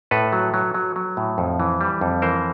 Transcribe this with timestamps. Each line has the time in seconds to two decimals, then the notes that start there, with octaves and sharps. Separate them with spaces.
0.11 A2 A4 B4
0.32 F#3
0.54 F#3
0.74 F#3
0.96 F#3
1.17 A2
1.38 F2
1.60 E3
1.81 G3
2.01 F2
2.22 E3 A#4 C5